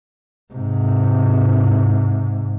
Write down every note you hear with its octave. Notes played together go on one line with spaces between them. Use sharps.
G#2 C3